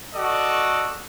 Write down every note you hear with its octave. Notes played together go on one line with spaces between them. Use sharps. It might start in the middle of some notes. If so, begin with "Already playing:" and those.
F#4 A4 D5 D#5